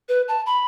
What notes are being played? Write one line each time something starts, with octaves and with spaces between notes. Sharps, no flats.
B4
A5
B5